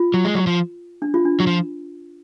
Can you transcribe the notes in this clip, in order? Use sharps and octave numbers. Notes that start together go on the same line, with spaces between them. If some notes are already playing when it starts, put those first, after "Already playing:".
Already playing: F4
F#3
G#3
F#3
F3
D4
F4
D4
F#3
F3